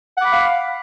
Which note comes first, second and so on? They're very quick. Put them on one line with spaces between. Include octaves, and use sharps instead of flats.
F#5 D6 B5 F5